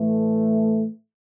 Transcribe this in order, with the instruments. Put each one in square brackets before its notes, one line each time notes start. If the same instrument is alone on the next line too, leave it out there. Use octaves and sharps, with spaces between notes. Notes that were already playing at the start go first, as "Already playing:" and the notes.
Already playing: [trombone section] A2 E3 A3